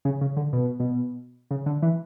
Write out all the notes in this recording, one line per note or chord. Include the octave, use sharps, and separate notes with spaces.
C#3
C#3
D3
B2
B2
C#3
D3
E3